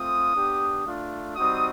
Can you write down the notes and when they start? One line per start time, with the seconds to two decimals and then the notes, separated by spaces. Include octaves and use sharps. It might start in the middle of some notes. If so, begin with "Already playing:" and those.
Already playing: A3 C4 F4 D#6
0.35 B3 D4 G4
0.84 A3 D4 F4
1.35 G3 C4 D#4 F#4 D#6